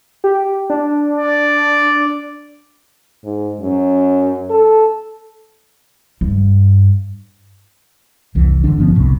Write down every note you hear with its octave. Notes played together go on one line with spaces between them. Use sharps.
G4
D4
D5
G#2
F#2
A4
G2
F1 C2 E3
G#1 D3 E3 D4
G1 F3 B3 C#4
F#1 C2 A2 C3